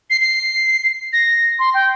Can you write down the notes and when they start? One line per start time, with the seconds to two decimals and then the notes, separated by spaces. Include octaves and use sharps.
0.10 C7
0.21 C7
1.13 A#6
1.59 C6
1.74 G5